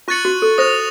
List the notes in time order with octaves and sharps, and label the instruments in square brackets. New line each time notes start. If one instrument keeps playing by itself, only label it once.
[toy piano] F4 [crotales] C#6 F#6 A6 C#7 F#7
[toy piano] F#4
A4
[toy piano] C5 [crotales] D#6 A#6 F7